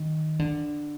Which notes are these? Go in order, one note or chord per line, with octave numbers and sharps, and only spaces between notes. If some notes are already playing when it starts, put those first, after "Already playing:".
Already playing: D#3
D3